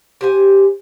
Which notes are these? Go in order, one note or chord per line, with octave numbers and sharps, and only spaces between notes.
G4 C5 G#5